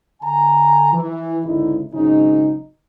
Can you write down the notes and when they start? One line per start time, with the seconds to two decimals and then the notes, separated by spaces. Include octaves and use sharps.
0.22 D3 G#5 A#5
0.93 E3
1.44 G#1 C#2 D3 D#4 E4
1.94 G#1 C#3 F#3 C#4 D#4